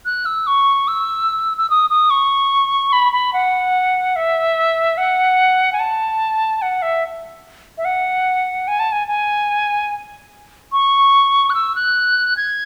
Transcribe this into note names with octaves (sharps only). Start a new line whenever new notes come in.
F#6
E6
C#6
E6
E6
D#6
D#6
C#6
B5
B5
F#5
E5
F#5
G#5
A5
F#5
E5
E5
F#5
G#5
A5
G#5
G#5
C#6
F#6
E6
F#6
G#6